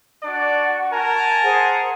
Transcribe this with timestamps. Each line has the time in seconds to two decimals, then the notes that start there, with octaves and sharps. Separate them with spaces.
0.23 D4 F#4 D5
0.92 A#4 G#5 A5
1.43 G#4 C5 F#5